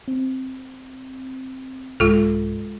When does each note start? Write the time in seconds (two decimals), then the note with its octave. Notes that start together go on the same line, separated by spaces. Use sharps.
0.08 C4
2.00 C2 G#2 G#3 F4 A4